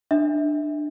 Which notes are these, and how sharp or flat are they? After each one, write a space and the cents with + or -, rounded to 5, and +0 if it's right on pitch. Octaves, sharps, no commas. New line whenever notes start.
D4 +20 E5 -25